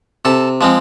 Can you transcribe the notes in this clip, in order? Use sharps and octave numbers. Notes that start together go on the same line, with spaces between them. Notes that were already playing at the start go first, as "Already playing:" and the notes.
C3 A4
F3 G#3 C4